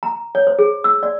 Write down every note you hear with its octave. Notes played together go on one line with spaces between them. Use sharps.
A#5
C#5
C5
G#4
E6
D5